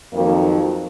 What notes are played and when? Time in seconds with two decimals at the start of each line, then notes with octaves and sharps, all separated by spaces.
0.13 F2 D#3 F#3 A#3